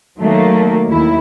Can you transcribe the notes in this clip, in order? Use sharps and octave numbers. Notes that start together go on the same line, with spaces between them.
D#3 F#3 A3 A#3
D#2 E4